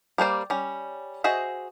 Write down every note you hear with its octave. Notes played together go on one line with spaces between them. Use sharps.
G3 A#3 C5 D5
G3 C#4
F#4 G#4 C5 D#5 E5